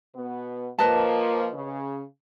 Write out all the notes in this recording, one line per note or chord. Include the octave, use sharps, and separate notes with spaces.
B2 B3
F3 A#3 B4 D#5 A5
C#3